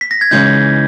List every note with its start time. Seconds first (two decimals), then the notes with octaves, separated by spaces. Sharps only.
0.01 B6
0.11 A#6
0.21 G#6
0.31 C#3 E3 G#3 D#4 G6